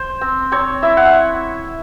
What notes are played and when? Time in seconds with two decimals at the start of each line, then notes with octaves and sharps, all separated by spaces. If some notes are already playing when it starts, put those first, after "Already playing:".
Already playing: C5
0.21 C4
0.52 C4 C#5
0.82 E4 E5
0.97 F#5